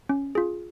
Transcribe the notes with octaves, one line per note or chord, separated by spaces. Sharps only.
C#4
F4 G#4